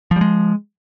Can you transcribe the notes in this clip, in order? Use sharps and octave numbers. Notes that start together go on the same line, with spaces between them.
F3 G3 G#3